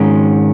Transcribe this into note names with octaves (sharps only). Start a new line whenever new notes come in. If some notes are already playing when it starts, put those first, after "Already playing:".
Already playing: G#2 D#3 G#3 C#4